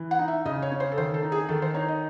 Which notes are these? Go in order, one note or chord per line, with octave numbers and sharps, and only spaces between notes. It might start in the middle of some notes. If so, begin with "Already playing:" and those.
Already playing: E3
F#5
D#4
E5
C#3 D#5
C#5
C#4
C5
A4
D#3 C5
A4
D#4
G#4
D#3 A4
C5
D#4 C#5
D#5